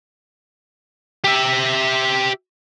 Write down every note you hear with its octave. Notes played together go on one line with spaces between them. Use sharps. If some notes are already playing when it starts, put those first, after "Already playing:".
G4 E5